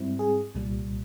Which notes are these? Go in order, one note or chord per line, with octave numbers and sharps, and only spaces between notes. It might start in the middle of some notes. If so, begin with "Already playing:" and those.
Already playing: G#2 G3 C4 E4
G#4
C2 A#2 G3